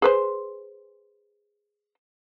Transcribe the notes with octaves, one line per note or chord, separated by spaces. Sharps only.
G#4 B4 C5